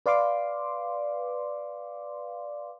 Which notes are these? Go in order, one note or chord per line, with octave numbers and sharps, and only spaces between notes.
B4 D5 F5 C6 D6